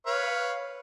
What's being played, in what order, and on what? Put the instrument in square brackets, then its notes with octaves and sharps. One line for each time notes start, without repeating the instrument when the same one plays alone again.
[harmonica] B4 C#5 F5